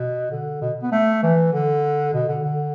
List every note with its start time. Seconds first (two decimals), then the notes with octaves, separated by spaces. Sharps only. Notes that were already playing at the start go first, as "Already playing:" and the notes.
Already playing: B2
0.31 D3
0.61 B2
0.83 B3
0.92 A3
1.23 E3
1.53 D3
2.14 B2
2.29 D3
2.44 D3